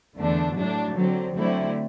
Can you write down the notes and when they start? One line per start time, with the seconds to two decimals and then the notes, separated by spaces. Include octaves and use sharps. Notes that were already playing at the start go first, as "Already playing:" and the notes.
0.18 E2 D3 A3 D4
0.57 A2 F#3 A3 D4
0.96 D3 F#3 C4
1.35 D3 F#3 A3 C4 E4